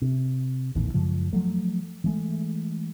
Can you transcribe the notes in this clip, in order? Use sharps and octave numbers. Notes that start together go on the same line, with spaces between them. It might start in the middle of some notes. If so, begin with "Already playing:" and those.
C3
A#1 E2 A2 D#3
F#2 C#3 F3 G#3
F3 F#3 A3
E3 G#3 A3